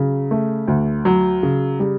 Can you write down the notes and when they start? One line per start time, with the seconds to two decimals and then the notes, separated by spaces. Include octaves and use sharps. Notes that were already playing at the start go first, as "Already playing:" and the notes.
Already playing: C#3 F#3
0.31 A3
0.68 D2
1.05 F#3
1.43 C#3
1.80 G3